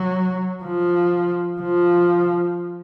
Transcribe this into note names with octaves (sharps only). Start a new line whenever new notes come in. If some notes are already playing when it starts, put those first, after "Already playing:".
Already playing: F#3
F3
F3